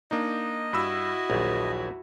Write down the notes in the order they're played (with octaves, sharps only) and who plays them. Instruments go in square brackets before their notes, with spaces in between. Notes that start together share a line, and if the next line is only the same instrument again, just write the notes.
[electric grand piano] A#3 D4 D#4 [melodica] D#5
[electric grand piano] G2 B5 E6 [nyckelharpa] E4 F#4
[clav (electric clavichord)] A#1 [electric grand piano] D#2 F#3